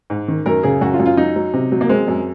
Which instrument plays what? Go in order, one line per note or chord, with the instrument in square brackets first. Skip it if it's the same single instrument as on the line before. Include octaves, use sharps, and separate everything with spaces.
[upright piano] G#2
D#3
F#2 A#4
C#3 G#4
F#2 F#4
F4
F#2
F4
F#3 D#4
F#3
C3
F#3
A#3
G#3 C4
F#2